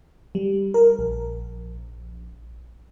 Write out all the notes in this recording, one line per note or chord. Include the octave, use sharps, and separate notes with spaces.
G3
A#4
A#1